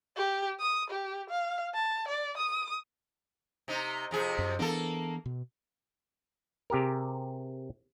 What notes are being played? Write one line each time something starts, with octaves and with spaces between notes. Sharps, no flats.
G4
D#6
G4
F5
A5
D5
D#6
C3 D#4
F2 C3 G#4
F#2
E3 A#3 B3 D4 A4
B2
C3 G4 G#4 A#4